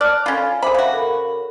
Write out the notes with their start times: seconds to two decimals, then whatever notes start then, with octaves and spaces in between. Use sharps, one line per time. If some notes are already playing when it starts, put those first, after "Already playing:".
0.01 D5 A5 F6 F#6
0.26 C#4 F4 A4 G#5 B5
0.62 G#4 C5 E5 B5 D6
0.74 C#3 F#4 F5
0.93 A4 A#4 B5